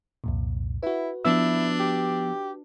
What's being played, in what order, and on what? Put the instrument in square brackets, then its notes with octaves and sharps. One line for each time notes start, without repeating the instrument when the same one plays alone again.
[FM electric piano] C2 F2 A#2
[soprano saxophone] E4 [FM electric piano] F#4 B4
[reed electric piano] F3 B3 E6 [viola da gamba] D4 [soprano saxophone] E4
[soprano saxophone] G4